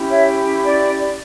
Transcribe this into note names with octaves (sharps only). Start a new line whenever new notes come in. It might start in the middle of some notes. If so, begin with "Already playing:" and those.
Already playing: C#4 E4 G4
C#5 E5
D5
D5